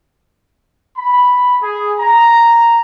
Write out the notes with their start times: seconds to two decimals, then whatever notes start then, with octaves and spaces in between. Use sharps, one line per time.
0.97 B5
1.61 G#4
1.99 A#5